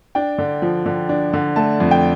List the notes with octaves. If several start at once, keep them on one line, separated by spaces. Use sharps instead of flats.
D4 G5
D3
F3
D3
D4
D3
A3 A5
F2
G5